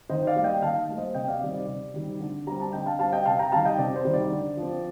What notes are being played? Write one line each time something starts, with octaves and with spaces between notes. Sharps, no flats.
D#3 C5 D#5
D5 F5
G3 A#3
D#5 G5
D#3 F5 A5
G3 A#3
C5 D#5
C3 D#5 G5
D5 F5
D#3 G3 C4 D5
D5
C3
D#3 G3 C4
D3
G3 C4 A#5
A5
D3 D#5 G5
F5 A5
G3 C4 F5 A5
D#5 G5
C3 F5 A5
G5 A#5
D#3 G3 F5 A5
D#5 G5
C3 D5
C5
D#3 G3
D5
D3
F3
C4